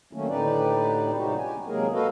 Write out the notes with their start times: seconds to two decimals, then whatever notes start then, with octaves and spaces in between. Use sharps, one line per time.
0.13 D#3 F#3 A3 A#3 C#4
0.28 A2 D3 D#4 G4 B4 D5
1.17 C3 F3 G#3 D#4 F#4 G4
1.39 G4 G#5
1.67 C3 F#3 G#3 A#3 G#4 A#4
1.93 F#4 A4 B4 D#5 F5